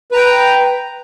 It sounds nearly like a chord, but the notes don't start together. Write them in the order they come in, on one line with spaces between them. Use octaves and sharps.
B4 A#5 G5